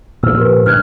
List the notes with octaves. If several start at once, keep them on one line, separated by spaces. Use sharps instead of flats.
A#2 F3 E6 F6
G4 A#4 B4
G2 D3 G#3 F6 F#6 G#6